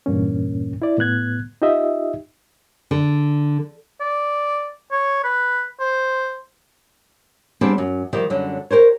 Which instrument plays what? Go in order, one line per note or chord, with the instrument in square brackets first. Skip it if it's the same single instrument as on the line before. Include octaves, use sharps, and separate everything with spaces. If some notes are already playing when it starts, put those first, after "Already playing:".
[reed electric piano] E2 G2 A#2 A#3 C#4
E4 D5
A2 B3 F#6 G#6
D#4 F4 G4 D#5 E5
[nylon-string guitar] D3
[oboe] D5
C#5
B4
C5
[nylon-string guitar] G3 B3 C4 D4 G#4
F#2
D#3 F3 G3 G4
F#2 D3 F#3 G3
G4 A#4 C5 C#5